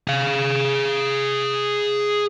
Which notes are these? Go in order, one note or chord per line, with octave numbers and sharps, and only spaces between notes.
G#4 F5